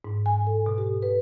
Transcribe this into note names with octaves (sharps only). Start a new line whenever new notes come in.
G#2
G#5
A4
B2
G4
B4